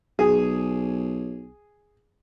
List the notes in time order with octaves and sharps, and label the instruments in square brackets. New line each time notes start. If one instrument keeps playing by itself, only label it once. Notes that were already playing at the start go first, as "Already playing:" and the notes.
[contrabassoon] B1 [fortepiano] G#4